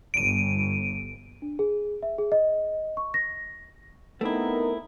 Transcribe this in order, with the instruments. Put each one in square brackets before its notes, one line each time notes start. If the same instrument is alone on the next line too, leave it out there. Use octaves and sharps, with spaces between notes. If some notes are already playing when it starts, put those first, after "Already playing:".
[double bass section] G1 [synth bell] D7 D#7
[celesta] D4
G#4
E5
G#4
D#5
C#6
A#6
[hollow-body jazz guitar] A3 C4 E4 [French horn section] B3 A#4 [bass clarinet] D#4